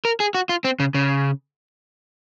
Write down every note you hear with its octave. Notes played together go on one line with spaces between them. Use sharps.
A#4
G#4
F#4
F4
C4
C#3
C#3